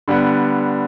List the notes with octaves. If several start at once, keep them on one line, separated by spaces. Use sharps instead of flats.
D3 G3 B3